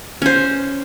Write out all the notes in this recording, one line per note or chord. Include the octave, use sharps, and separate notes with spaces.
C#4 C5